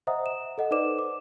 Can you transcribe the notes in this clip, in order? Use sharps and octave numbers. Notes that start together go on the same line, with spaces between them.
C5 D#5 E5 F#5 A#5 D#6
E7
A4 D#5 F#5
D#4 B4 C5 D5 D6 E7
D6